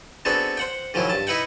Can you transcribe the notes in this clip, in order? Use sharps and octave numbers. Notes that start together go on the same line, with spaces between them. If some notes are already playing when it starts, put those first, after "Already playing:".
B3 C4 D4 F#4 G#4 A4
C5 F#5 G5
G#2 D#3 F3 F#3 E4
G2 A5
D#4 E4 B4 E5 F#5 G5